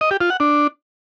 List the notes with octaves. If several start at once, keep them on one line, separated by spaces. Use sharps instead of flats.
D#5
G4
F4
F#5
D4